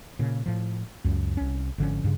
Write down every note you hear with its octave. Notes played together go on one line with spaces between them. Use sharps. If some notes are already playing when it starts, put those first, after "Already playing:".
A#2 C#3
A2 F3
C#2 F#2
C2 C#4
G#1 D3 F3 C#4
G2 C#3